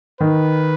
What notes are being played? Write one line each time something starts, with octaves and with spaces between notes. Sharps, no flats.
D#3 B4